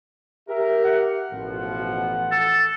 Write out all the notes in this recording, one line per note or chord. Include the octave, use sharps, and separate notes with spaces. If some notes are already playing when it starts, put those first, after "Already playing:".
G4 A#4 E5
F#5
A1 B2 F3
A4